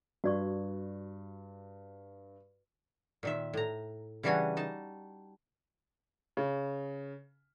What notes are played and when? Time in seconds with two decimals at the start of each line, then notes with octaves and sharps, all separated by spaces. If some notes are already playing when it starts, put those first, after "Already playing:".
0.24 G2 F#4 D5 C#6
3.23 A#2 D#3 E5
3.53 A2 A#5
4.23 C#3 E3 G3 D4 F#4 G#5
4.57 D#4 A5
6.37 C#3